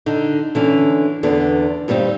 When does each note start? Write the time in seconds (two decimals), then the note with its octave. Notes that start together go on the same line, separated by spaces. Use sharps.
0.06 D3 D#4
0.55 D3 E3 C#4
1.23 E2 D3 B3
1.88 G2 G3 B3 C4 D#4